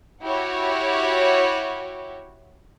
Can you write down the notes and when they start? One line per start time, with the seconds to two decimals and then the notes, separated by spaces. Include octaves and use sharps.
0.24 E4 F#4 G4 C#5